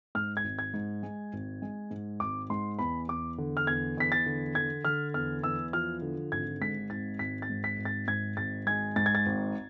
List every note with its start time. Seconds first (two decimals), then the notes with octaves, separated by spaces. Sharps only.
0.15 G#2 F6
0.37 G#6
0.44 G#1
0.59 G#6
0.74 G#2
1.03 G#3
1.33 G#1
1.62 G#3
1.91 G#2
2.20 G#1 D6
2.50 G#2 C6
2.79 E2 B5
3.08 E2 D6
3.38 D3
3.57 F6
3.67 E2 G#6
3.97 E2 B6
4.12 A6
4.26 D3
4.55 D3 G#6
4.85 D3 F6
5.14 E2 F6
5.43 E2 E6
5.73 F3 F6
6.02 D3
6.32 G#1 G#6
6.61 G#2 B6
6.90 G#1 A6
7.19 G#1 B6
7.42 A6
7.50 G#2
7.64 B6
7.78 G#1
7.85 A6
8.08 G#2 G#6
8.37 G#1 A6
8.67 G#3 G#6
8.96 G#2 A6
9.06 G#6
9.15 A6
9.26 G#1